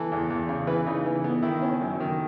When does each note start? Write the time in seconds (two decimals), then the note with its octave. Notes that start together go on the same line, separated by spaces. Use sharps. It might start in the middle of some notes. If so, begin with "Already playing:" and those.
Already playing: E3 A4
0.12 E2
0.30 E2
0.49 C#3
0.67 E3 B4
0.86 C#3 D#4
1.06 E3
1.24 B3
1.43 D#3 E4
1.62 C#4
1.81 F#2
2.00 D#3